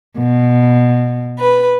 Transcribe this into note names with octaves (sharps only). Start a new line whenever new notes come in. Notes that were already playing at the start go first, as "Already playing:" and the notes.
B2
B4